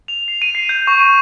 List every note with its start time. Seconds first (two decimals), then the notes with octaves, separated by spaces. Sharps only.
0.08 F7
0.28 C7
0.42 D#7
0.55 C7
0.69 G6
0.87 C#6
0.99 D#7